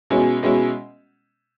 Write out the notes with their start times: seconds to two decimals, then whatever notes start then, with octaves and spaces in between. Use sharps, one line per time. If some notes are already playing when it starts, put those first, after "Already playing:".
0.10 B2 G#3 C#4 E4
0.43 B2 G#3 C#4 E4